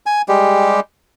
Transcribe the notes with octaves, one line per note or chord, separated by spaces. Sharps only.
G#5
G3 G#3 G4